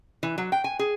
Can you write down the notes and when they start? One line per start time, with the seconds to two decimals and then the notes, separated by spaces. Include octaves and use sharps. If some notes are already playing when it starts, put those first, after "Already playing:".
0.23 E3
0.38 F#3
0.52 G5
0.64 G#5
0.79 G#4